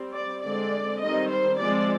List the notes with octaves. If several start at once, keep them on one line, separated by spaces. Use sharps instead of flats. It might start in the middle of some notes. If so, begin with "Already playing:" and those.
Already playing: G3 C4
D5
D3 G#3 C4 D5
D#3 G3 C4 D#5
C5
F3 G#3 C4 D5